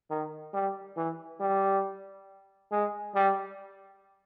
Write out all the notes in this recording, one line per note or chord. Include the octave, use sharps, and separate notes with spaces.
D#3
G3
E3
G3
G#3
G3